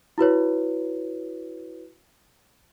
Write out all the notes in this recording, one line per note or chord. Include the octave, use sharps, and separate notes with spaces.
E4 F#4 B4 C#5